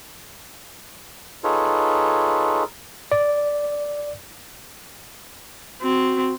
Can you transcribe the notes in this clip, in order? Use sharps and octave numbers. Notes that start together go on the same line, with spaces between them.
D#4 F4 G#4 A4 B4 C#5
D5
C4 F#4